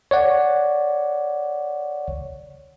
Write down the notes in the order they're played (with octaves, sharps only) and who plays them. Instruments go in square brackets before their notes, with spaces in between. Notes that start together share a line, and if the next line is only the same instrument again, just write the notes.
[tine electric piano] C#5 D5 F#5